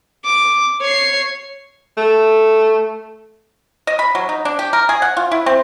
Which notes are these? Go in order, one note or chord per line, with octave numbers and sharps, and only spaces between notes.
D6
C#5 C7
A3
D#5
B5
F#3
D#4
D4
G4
A#4
G#4
F#5
F4
E4
C4